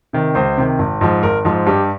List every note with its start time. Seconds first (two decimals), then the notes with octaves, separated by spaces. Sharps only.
0.13 C3 D#3
0.35 C#2 C5
0.58 C3 D#3
0.79 G#1
1.01 G#2 F3
1.23 G#1 A#4
1.45 G#2 F3
1.66 G2 G4